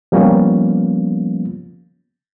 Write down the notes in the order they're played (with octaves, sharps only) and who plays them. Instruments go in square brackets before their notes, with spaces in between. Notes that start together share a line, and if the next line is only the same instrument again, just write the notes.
[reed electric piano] F3 G3 A#3 B3 C#4 F4